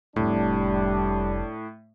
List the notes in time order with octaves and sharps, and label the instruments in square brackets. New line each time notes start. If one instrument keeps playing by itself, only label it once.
[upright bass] F1 [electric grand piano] A2 [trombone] G3 [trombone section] D4